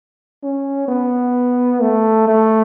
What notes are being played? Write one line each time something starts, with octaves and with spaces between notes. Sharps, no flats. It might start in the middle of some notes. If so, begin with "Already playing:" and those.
C#4
B3
A3
A3